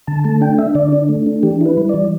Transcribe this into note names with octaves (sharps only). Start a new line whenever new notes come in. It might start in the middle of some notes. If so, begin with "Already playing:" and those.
D3 A5
A3 A5
D4 G5
D4 E5
D3 D5
D4
A3
D4
E3 G4
E4 B4
G3
E3 D5